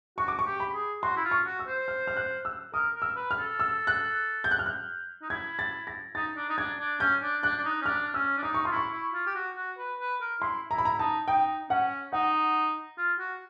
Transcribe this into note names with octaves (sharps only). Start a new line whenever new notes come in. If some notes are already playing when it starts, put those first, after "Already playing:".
F#4 C#6
D6
C#6
G4
B5
G#4
F#4 C6
E4
F4
C#6
F#4
E6
C5
F6
F6
F#6
E6
A#4 D#6
A#4
E6
B4
F6
A4
E6
F#6
G6
F#6
F6
F#6
D#4
E4 G#6
A6
A#6
D#4 A6
D4
D#4
D4 G#6
D4
C#4 G6
D4
D4 F#6
D4
D#4
C#4
D4 F6
C#4 E6
D4
D#4 D6
C#6
F4 C6
E4 C#6
E4
F4
G4
F#4
F#4
B4
B4
A#4
E4 C6
E4 A#5
B5
A#5
E4
D#4 A5
D#4 G5
C#4 F#5
D#4 F#5
F4
F#4